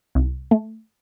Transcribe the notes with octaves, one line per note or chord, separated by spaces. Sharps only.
C2
A3